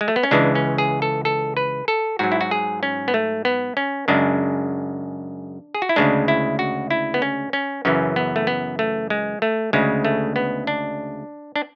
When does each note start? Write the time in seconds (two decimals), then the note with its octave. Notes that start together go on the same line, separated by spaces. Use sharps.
0.01 G#3
0.08 A3
0.16 B3
0.23 C#4
0.31 C#2 C#3 E3 G#3 D4
0.55 C#4
0.78 G#4
1.02 A4
1.25 A4
1.57 B4
1.88 A4
2.19 G#2 F#3 F#4
2.32 E4
2.41 F#4
2.51 G#4
2.83 C#4
3.08 B3
3.14 A3
3.45 B3
3.77 C#4
4.08 F#2 C#3 G#3 D4
5.75 G#4
5.82 F#4
5.89 E4
5.96 D2 C#3 G#3 D4
6.28 E4
6.59 F#4
6.90 E4
7.14 B3
7.22 C#4
7.53 C#4
7.85 F#2 C#3 E3 C#4
8.16 B3
8.36 A3
8.47 B3
8.79 A3
9.10 G#3
9.42 A3
9.73 D2 C#3 G#3
10.05 A3
10.36 B3
10.67 D4
11.56 D4